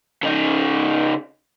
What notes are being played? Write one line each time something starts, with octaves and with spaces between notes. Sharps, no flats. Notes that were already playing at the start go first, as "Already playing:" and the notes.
C#3 D#4